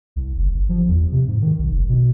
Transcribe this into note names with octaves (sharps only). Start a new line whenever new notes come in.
C2
F#1
G1
F3
E2
C3
G#2
D#3
B1
F1
B2